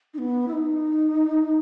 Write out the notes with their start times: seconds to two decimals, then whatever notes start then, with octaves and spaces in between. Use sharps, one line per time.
0.14 D#4
0.18 B3
0.48 E4
0.53 D#4